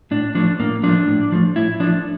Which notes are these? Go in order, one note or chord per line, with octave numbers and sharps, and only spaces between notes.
A2 D4
F3 A3 D4
A2 A#3
F3 A3 D4
A2
F3 A3
A2 E4
F3 A3 D4